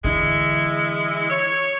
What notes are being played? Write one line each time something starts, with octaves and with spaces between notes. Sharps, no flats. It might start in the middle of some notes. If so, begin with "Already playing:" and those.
D3 E3 G#3 E4
C#5